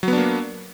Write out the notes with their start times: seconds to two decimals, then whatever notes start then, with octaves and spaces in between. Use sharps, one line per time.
0.03 F#3
0.08 B3
0.13 D4
0.18 A#3